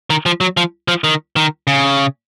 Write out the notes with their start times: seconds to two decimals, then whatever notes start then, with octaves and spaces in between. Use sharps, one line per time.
0.10 D#3
0.26 F3
0.41 F#3
0.57 F3
0.88 F3
1.04 D#3
1.36 D#3
1.67 C#3